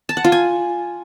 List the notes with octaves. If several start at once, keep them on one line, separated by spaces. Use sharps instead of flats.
A5
F#5
F4
G#5